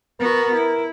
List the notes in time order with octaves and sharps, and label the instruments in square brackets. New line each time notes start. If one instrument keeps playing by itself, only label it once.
[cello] B3 F#4 [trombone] A#4
[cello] E4